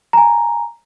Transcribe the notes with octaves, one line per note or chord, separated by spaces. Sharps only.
G#5 A#5